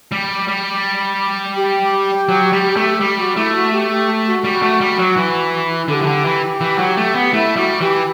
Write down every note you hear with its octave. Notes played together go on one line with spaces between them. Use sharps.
G3
G3
G4
F#3
G3
A3
G3 G4
F#4
A3 E4
F#4
G4
G4
F#4
G3
A3
G3
F#3
E3
D3 A4
G4
E3
D3
E3
E3
F#3
A3
B3
A3 E4
G3 F#4
E3 G4